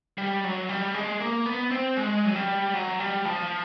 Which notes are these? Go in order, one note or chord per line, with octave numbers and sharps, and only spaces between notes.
G3
F#3
G3
G#3
A#3
B3
C4
G#3
F#3
G3
F#3
G3
F3